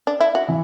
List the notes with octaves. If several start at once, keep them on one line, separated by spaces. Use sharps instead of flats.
D4
E4
F#4
E3